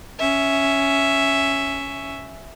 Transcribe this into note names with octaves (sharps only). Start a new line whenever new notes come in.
C#4 E5